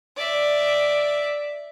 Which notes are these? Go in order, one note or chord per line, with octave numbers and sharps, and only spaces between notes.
D5 E5